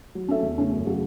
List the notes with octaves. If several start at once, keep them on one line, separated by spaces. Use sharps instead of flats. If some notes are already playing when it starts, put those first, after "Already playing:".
F#3
C#4 A4 E5
E2
C#3 A3 C#4
F#2
C#3 F#3 A3 F#4